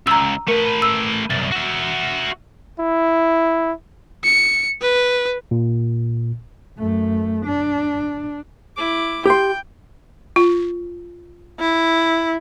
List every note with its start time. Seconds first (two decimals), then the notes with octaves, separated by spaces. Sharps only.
0.07 C#2 A#5 E6
0.48 A3 A#4 B4
0.82 E6
1.30 C2 F#2 A6
1.51 F#4 E5
2.80 E4
4.24 C#7
4.82 B4
5.51 A#2
6.77 F#2 A3
7.46 D4
8.76 E4 D6
9.26 G4 G5 C6
10.36 F4
11.59 E4